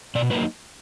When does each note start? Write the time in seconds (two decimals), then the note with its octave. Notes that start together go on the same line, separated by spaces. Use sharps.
0.15 B2 D5
0.30 F#3 A#3 D#4 B4